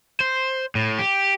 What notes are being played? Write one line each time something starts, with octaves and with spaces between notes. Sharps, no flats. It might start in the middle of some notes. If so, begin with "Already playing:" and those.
C5
A2
G4